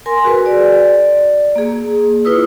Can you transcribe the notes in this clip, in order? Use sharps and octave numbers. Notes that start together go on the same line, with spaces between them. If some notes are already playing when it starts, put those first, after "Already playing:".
A#4 G#5 C6
F#4 G#4 B4
D5
A#3 G#4
E4 F4 B4 D#6 E6